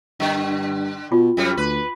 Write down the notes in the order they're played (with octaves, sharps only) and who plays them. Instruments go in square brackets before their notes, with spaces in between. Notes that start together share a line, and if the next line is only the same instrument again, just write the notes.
[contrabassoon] G2 [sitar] D3
[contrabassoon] B2 [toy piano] F4
[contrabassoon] F#2 [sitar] C3 G3
[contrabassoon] D2 [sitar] B4